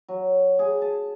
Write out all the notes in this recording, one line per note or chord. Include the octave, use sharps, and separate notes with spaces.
F#3
G#4
A5